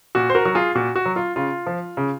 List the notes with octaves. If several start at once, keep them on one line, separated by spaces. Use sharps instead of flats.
A#2 F#4
C5
F#4 A#4
F#3 F#4
F4 G#4
A#2 F#4
F#4
F#3
F4
C#3 F4
F3
C#3